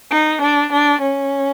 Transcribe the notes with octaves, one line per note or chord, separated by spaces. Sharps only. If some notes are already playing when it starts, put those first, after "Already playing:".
D#4
D4
D4
C#4